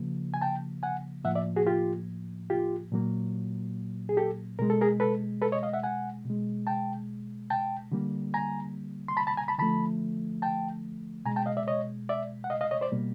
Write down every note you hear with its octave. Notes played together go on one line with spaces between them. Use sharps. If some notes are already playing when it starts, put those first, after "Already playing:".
Already playing: C#3 F3 A#3
G#5
G5 A5
F#5 G#5
A2 F3 A#3 E5 F#5
D5 E5
F#4 G#4
F4 G4
F4 G4
A#2 F#3 A#3
G#4
G4 A4
B2 G#3 A#4
A4
G#4 A#4
A4 B4
A4 B4
C#5 D#5
D#5 F5
E5 F#5
F#5 G#5
B2 G#3
G5 A5
G5 A5
D3 G3 A#3
G#5 A#5
C6
A5 B5
A5 B5
G#5 A#5
A5 B5
D3 F3 A3 A5 B5
G5 A5
B2 G#3 G#5 A#5
G5 A5
D#5 F5
D5 E5
C#5 D#5
D5 E5
F#5
D#5 F5
D#5 F5
C#5 D#5
C5 D5
B2 G3 A#3